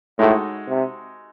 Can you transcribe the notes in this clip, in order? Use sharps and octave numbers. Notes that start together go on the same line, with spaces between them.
A2 G#3 D#4 F#4 A4
C3